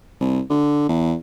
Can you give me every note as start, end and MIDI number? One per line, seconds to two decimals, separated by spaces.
0.21 0.41 36
0.50 0.85 50
0.89 1.14 40